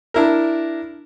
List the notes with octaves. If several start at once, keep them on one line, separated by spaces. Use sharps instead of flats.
D4 E4 A#4